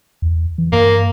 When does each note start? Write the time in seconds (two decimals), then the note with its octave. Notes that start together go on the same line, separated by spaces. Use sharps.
0.22 E2
0.58 E3
0.72 G2 A#3